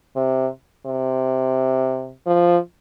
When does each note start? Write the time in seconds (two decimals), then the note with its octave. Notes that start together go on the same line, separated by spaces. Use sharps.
0.16 C3
0.86 C3
2.26 F3